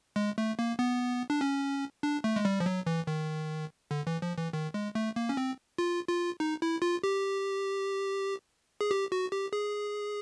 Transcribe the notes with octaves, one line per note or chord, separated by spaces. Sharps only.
G#3
A3
A#3
B3
D4
C#4
D4
A3
G#3
G3
F3
F#3
E3
D#3
D3
E3
F3
E3
D#3
G#3
A3
A#3
C#4
C4
F4
F4
D#4
E4
F4
G4
G#4
G4
F#4
G4
G#4